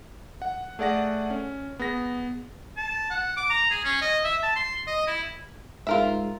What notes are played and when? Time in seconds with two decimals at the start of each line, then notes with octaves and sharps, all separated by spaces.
0.42 F#5
0.79 A3 G#4 D5 F#5 A#6
1.30 C#4
1.79 B3 G#4 A#6
2.77 A5
3.10 F#5
3.37 D6
3.50 A#5
3.71 G#4
3.84 C#4
4.02 D#5
4.24 E5
4.43 A5
4.56 C6
4.87 D#5
5.07 E4
5.87 G#2 F4 A#4 E5